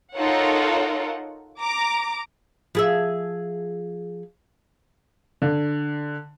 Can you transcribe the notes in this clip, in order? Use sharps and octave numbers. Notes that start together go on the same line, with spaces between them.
D#4 F4 A4 A#4 C#5 F#5
A#5 D6
F3 G#4 E5
D3